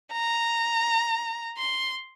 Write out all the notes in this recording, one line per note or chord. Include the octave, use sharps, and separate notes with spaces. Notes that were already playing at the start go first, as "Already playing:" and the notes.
A#5
C6